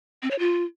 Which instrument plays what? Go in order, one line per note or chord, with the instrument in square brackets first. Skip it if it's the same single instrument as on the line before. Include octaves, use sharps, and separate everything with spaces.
[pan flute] C4
C#5
F4